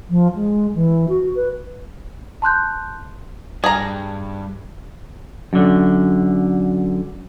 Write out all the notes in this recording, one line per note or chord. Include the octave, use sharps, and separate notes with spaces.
F3
G#3
E3
F#4
B4
A5 C6 F#6 G6
G2 G#4 A#5
F#2 D3